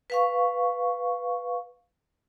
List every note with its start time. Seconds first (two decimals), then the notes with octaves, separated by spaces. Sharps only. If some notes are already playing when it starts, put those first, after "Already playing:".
0.10 B4 F5 C#6